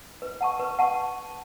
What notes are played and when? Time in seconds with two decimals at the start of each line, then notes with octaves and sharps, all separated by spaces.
0.22 B4
0.41 F#5 A5 C#6
0.59 B4
0.79 F#5 A5 C#6